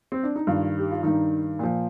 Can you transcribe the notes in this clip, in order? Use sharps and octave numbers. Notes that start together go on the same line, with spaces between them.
C4
D4
D#4
G2 D#3 F4
G4
F4
G2 D#3 D#4
A#2 F3